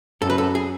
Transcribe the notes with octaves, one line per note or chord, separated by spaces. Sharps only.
F#2 A4
B4
A4
G#4